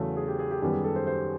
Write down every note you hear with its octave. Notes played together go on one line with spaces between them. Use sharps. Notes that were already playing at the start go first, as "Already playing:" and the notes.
Already playing: E2 C#3 F#3 A3
G#4
G4
G#4
G4
F#2 D#3 G3 B3 G4
G#4
A4
C5
C5